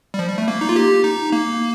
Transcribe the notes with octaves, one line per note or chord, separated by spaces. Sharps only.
G3
F3
G3
A3
A#3
D#4
F4
G4
D#4
A#3